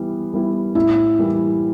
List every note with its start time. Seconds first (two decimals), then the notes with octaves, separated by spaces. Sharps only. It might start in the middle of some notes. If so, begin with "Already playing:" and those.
Already playing: E3 G3 B3 E4
0.34 G3 B3 E4
0.75 A2 E4
1.18 E3 G3 A#3